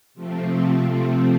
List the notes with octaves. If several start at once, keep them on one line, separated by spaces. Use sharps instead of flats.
C3 F3 A3 C4